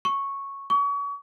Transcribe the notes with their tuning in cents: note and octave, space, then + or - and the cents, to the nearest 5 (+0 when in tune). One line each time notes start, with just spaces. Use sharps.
C#6 -5
C#6 +35